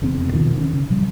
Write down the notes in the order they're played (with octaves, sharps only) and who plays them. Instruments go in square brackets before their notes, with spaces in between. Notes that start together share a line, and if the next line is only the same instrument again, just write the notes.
[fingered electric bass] F1 E2 C#3 C4
E2 B2 D#3 F3
C#4 D4
C#3
A#2 F3 G3